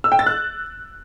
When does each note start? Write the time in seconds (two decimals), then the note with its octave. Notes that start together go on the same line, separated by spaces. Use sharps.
0.04 E6
0.12 G5
0.19 A6
0.26 F#6